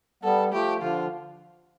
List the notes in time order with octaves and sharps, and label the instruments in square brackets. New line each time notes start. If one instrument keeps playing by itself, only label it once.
[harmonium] G3 B3 [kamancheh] A4
[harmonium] F3 A3 [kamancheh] G4
[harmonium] D3 F3 [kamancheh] F4